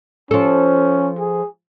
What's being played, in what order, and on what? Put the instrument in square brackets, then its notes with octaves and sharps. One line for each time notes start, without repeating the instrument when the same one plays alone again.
[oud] F3 A4 [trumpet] C#4
[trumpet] G#4